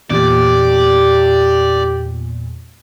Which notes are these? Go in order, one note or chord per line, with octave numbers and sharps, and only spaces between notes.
E2 A#2 G4 D5